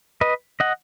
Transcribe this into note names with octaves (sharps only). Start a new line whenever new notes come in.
B4 D#5
D#5 F#5